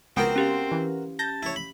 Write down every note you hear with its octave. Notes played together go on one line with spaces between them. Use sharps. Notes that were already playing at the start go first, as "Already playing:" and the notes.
C#2 B3 C4 F#4 A#4 G5
C#4 G4 F5
E3
A5 G6 A#6
E4 C#5
B5